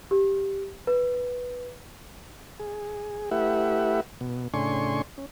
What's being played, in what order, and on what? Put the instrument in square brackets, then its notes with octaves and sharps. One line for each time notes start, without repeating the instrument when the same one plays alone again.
[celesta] G4
B4
[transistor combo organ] G#4
A3 E4 G4 B4 E5 F#5
B2
A2 C#3 D4 G#5 C6 C#6
C#4